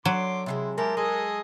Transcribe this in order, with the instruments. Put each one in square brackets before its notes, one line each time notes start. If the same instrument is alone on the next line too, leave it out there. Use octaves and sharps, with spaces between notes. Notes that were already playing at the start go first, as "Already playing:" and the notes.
[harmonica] D3 C6 D6 [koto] F#3
[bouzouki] C3 D#3 G#3 [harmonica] E4
[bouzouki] G#3 A#3 [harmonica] E4 G4 A5 [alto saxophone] A#4
[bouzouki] G#3 [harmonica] G#4 A4 D#5